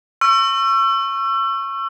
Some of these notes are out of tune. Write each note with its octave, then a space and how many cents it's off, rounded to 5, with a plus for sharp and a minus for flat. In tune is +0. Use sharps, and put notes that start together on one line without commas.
C#6 -15 E6 +35